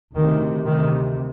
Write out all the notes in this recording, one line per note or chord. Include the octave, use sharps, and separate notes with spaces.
D2 C3 D#3
D2 C3 D#3